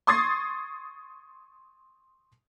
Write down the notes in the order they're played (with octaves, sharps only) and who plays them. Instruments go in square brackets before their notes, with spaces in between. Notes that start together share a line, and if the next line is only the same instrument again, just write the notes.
[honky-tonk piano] C6 C#6 D#6 G#6 A6 C7